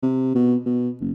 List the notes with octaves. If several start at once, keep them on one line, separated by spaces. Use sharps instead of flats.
C3
B2
B2
F#1